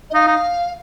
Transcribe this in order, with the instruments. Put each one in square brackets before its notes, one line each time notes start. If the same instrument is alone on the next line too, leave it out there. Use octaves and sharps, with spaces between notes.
[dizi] D#5
[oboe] D#4 [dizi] F5
[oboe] D#4